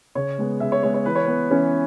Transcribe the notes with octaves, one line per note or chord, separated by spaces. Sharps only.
C#3 C#5
G#3 B3
C#3 E5
C#5
G#3 B3 C#5
C#5
E3 B4
C#5
B3 B4
E3 C#4